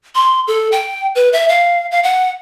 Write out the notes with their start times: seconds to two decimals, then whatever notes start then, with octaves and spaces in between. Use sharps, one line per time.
0.15 C6
0.47 A4
0.72 G5
1.15 B4
1.33 E5
1.49 F5
1.91 F5
2.04 F#5